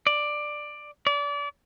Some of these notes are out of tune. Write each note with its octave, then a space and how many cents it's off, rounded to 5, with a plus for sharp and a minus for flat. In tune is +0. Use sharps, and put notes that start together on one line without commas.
D5 +10
D5 -30